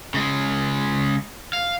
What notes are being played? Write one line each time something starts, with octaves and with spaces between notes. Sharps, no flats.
C#3 G#3
F5